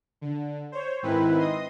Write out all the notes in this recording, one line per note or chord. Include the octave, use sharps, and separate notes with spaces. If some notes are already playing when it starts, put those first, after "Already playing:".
D3
C5 C#5
G#2 D#3 C4 E4 B4
D#5 C6 D#6